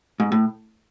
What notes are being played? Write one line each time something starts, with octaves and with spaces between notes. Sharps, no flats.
G#2
A2